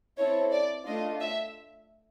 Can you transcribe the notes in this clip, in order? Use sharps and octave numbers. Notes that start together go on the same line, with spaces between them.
C4 E4 A4 C#5
D5
A3 D4 F4 D#5
E5